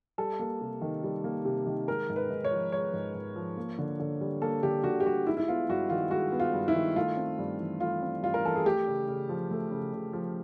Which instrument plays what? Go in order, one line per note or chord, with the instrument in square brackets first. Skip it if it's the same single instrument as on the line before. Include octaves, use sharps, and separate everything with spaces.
[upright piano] G3 A4
A#3
C3
D#3
G3
A#3
C3
D#3
G#3 A#4
G#2
B4
G#2
C#5
F3
G#3 C#5
G#2
G#2
F3
A#3
D3
D3
G3
A#3 A4
D3 G4
D3 F#4
G4
G3 F#4
G#3 E4
E4
B3 F4
G2 F#4
D#3 F4
G#3 F#4
B3
F4
G2
E4
D#3
A3 F4
C4
G2
E3
A3 F4
C4
G2 F4
A#4
E3 A4
G#4
A3 G4
C#3
C#3
F3
A3
C#3
C#3
F3